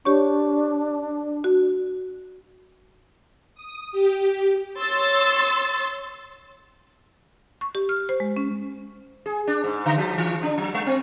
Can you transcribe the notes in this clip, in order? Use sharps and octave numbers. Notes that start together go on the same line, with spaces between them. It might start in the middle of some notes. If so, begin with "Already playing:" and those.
D4 G4 C#5 C#6
F#4
D#6
G4
C#5 C6 E6 A6
C#6
G4
F6
C5
G#3
C#4
G#4
D4
G#2
D3
F3
E3
D4
F#3
G#3
C4